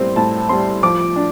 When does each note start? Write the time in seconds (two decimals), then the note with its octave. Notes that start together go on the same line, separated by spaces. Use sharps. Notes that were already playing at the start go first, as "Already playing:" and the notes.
Already playing: A2 G3 C4 C6
0.16 A2 A5
0.49 G3 C4 C6
0.83 F3 D6
1.16 D4